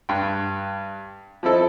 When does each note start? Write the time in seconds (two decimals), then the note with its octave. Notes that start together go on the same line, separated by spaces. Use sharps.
0.09 G2 G5
1.43 F3 C4 E4 A4 D#5